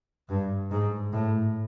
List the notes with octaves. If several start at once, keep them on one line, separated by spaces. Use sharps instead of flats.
G2
G#2
A2